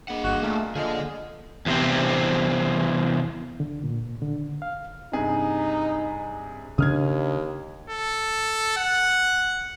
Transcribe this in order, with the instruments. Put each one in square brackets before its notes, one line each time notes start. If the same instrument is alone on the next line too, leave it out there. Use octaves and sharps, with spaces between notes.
[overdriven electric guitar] A#3 F#5 [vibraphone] D4 G#4 D#5
[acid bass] G1 [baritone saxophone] F#4
[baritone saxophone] A#2 [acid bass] A3
[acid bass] D3 [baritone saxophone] F3 [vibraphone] A#3 A4 D#6 [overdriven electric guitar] G#4 D#5
[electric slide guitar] E2 C3 C4
[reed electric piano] D3
A#2
D3
F5
[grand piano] G2 C3 G#4 [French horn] D#4
[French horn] D#2 [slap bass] C#3 D4 [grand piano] D#6 F6 G#6
[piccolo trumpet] A4
F#5